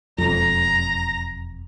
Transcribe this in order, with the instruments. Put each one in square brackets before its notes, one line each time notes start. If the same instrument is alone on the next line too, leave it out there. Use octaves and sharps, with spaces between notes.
[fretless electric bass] E1 F2 [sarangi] A#5